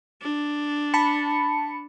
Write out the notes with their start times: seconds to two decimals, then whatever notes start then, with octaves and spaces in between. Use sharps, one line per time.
0.22 D4
0.94 A5 B5 C#7